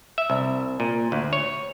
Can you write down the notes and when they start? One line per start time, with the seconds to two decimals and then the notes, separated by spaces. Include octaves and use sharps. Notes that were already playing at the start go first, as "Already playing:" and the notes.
0.18 E5
0.30 C2
0.80 A#2
1.12 D2
1.33 C#5